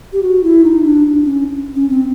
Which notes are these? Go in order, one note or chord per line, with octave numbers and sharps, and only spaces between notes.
G4
F#4
E4
D#4
D4
C#4
C#4
C4